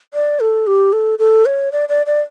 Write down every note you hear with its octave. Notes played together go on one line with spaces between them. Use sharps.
D5
A4
G4
A4
A4
C#5
D5
D5
D5